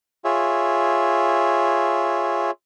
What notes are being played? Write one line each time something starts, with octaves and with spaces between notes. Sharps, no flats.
F4 G#4 C#5 E5